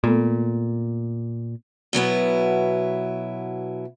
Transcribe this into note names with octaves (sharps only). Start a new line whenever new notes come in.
A#2 A3 B3 A4
B2 F#3 B3 E4